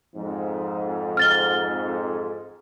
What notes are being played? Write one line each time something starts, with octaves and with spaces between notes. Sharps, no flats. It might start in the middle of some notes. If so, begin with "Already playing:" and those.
F2 G#2
F6 A6 G7